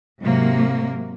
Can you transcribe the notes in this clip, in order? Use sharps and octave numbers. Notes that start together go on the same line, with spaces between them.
G#2 C3 F#3 A#3